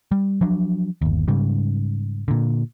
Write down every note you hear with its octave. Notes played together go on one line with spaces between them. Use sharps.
G3
F3 F#3 D4
G1 D#2
G#2 C#3 G3
A#2 D3